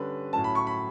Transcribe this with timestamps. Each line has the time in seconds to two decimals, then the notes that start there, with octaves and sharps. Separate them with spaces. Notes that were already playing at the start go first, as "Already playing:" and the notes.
Already playing: D3 G3 C#4 B4
0.33 A2 F#3 C#4 A5
0.44 B5
0.55 C#6
0.67 B5